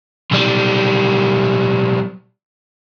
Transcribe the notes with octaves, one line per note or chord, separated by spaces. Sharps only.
B1 G3